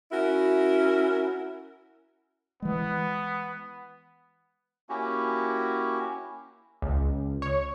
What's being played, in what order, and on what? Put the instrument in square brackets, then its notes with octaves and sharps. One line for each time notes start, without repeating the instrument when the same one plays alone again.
[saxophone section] C#4 E4 F#4 A#4
[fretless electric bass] E3 G#3 [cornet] B3
[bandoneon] A#3 C#4 E4 F#4 G4
[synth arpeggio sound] C#2
C#5